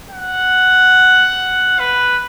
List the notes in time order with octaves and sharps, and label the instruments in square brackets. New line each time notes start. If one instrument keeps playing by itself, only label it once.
[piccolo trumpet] F#5
B4